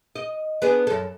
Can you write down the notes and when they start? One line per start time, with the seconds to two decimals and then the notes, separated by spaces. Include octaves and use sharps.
0.16 D#5
0.62 B3 D4 G#4
0.87 F#2 A4